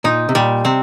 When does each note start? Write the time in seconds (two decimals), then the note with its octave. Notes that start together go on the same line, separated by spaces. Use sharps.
0.04 A#2 D#4
0.29 C3
0.35 A#2 G3
0.65 C3 C4